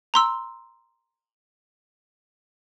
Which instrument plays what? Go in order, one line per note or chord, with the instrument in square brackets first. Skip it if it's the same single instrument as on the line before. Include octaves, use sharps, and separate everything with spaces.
[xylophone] A#5 C6 E6